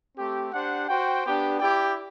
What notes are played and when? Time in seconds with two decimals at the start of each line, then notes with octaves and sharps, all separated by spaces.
0.17 A3 C4 G4
0.53 D4 G4 C5 F#5
0.88 F#4 C5 G5
1.24 B3 D4 G4
1.60 E4 G4 D5 G5